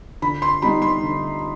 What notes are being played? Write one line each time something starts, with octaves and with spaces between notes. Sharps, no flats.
D3 B5
C6
G3 B3 D#4 B5
C6
D3